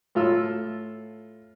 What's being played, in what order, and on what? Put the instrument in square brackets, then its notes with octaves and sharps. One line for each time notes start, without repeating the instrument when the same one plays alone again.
[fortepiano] A2 F4 A4 E6